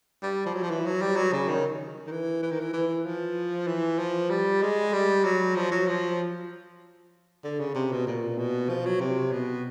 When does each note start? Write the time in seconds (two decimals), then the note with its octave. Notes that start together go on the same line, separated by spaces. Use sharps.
0.23 G3
0.46 F3
0.54 F#3
0.63 F3
0.70 E3
0.86 F#3
1.02 G3
1.16 F#3
1.33 C#3
1.48 D#3
2.07 D#3
2.11 E3
2.43 E3
2.51 D#3
2.60 E3
2.73 E3
3.06 F3
3.67 E3
3.99 F3
4.30 G3
4.62 G#3
4.93 G3
5.24 F#3
5.56 F3
5.71 F#3
5.88 F3
7.44 D3
7.60 C#3
7.75 C3
7.92 B2
8.07 A#2
8.38 B2
8.69 F3
8.86 F#3
9.00 C3
9.32 B2